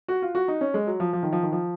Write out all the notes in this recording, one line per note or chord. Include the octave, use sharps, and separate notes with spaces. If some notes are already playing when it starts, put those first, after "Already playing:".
F#4
F4
F#4
D#4
C#4
G#3
F#3
F3
F3
D#3
F3
D#3
F3